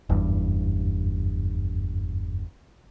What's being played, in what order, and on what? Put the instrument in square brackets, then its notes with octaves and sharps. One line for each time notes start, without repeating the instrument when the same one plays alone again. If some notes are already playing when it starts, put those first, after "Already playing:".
[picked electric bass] F#1 E2 G2